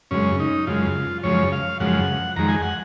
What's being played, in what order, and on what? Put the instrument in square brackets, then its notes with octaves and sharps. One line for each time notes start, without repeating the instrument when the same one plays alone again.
[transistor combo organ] F#2 C#3 G#3 C#4
D#4
F#2 C#3 G#3 F4
F#2 C#3 F3 G#3 C#5
F5
F#2 C#3 F3 G#3 F#5
F2 D#3 G#3 A#5
G#5
F#5